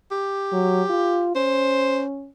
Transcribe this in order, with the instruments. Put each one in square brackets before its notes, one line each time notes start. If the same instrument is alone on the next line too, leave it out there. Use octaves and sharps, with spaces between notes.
[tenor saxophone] G4
[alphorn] F#3
F4
[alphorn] C#4 [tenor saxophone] C5